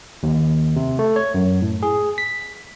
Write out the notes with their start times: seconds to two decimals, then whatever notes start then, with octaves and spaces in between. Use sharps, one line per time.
0.23 D#2
0.76 C3
0.99 A3
1.16 C#5
1.34 F#2
1.62 A2
1.83 G#4
2.18 B6